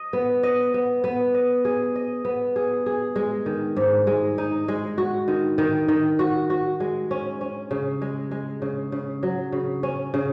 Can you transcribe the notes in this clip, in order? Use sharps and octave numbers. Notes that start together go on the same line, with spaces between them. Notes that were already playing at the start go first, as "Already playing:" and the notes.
Already playing: D#5
B3
D#5
B3
B3
D#5
G#4
D#5
B3
G#4
G#4
G#3
D#3
G#2
G#3
D#4
G#3
F#4
D#3
D#3
D#3
F#4
F#4
G#3
C#4
C#4
C#3
G#3
G#3
C#3
C#3
F#3
C#3
C#4
C#3